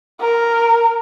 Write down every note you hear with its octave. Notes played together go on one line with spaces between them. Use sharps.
A#4